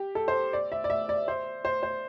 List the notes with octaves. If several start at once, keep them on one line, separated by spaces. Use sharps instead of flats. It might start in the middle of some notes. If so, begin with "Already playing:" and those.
Already playing: G4
A4
C5
D5
E5
D5
E5
D5
C5
C5
C5